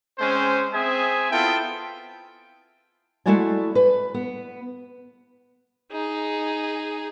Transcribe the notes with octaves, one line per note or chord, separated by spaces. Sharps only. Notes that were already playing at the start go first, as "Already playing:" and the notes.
G#3 C4 C#4 C5
C4 G#4 E5 G#5 D#6
B3 E4 F4 A4 G5
G#3 A3 E4 F#4 D5 G#5
B4
B3
D#4 G#4